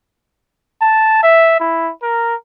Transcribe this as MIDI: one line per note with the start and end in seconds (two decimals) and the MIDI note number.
0.81 1.23 81
1.23 1.56 76
1.60 1.91 64
2.02 2.34 70